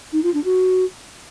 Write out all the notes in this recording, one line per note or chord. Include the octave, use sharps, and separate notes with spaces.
D#4
F4
D4
F#4